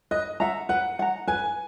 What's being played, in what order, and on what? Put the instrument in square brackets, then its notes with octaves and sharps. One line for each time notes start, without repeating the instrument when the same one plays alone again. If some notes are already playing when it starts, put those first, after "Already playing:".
[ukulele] B4 [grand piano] D#5
[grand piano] E5 [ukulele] F#5 A#5
[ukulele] B4 [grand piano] F#5
[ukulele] F#5 A#5
[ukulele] B4 [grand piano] G#5